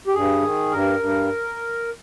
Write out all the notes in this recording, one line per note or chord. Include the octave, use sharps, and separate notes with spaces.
G4
G2 G#4
D#3
G2 A#4
G2